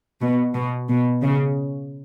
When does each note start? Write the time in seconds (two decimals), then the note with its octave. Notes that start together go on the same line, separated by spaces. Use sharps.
0.21 B2
0.54 B2
0.89 B2
1.23 C#3